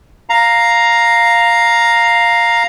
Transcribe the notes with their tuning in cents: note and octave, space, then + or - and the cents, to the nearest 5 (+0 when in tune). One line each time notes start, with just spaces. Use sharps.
F5 +0 A#5 +0